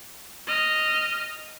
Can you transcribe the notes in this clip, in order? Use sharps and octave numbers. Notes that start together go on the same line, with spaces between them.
D#5 F6